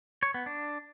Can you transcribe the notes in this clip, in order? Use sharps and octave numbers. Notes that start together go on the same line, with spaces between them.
C#5
B3
D4